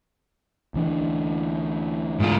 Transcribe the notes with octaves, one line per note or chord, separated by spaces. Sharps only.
D2 E3 D4
G#2 F4